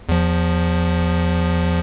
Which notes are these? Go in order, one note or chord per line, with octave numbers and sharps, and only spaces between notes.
E2 F3